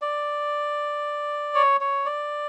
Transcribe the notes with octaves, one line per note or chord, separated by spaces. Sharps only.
D5
C#5
C#5
D5